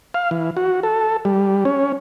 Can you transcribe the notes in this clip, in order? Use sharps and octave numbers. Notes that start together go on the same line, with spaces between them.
F5
E3
F#4
A4
G3
C#4